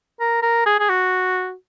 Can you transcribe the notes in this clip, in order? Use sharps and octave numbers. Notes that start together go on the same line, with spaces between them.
A#4
A#4
G#4
G#4
F#4